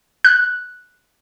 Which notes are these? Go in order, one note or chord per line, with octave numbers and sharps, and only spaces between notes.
F#6